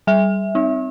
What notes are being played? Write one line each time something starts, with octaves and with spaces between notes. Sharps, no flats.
G3 E5
C4 D#4